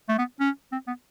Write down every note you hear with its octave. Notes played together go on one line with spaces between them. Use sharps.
A3
B3
C#4
C4
B3